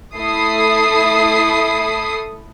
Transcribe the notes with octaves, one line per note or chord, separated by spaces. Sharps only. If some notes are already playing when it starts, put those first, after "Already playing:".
A3 E4 A4 D#6 C7